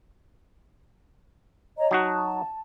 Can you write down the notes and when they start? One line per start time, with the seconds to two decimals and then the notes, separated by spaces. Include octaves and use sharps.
1.77 C#5 D#5 A#5
1.91 F#3 D#4 F#4 A5